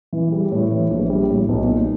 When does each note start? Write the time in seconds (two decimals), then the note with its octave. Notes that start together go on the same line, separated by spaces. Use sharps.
0.13 E3
0.32 G3
0.51 A2
0.72 E3
0.91 A#1
1.10 G3
1.29 A2
1.49 B1
1.69 A#2